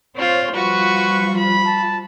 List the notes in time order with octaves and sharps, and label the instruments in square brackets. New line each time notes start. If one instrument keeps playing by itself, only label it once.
[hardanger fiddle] C4 F4 [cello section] C5 C#5
[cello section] F3 G3 F4 [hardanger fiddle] F#4 C#6 [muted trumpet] B4
[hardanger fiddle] B5
[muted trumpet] A5